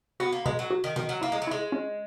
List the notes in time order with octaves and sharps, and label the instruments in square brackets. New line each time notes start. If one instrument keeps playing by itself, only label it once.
[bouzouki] B3 [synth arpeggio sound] F#4
[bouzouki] A#3
[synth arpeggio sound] B2 [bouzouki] G#3
[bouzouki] F#3
[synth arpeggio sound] F#4
[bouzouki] D#3
[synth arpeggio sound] B2 [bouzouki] D#3
[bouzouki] F#3
[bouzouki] A#3 [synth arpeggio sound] E4
[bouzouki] G#3
F#3
[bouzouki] G#3 [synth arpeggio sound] E4
[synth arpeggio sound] C#4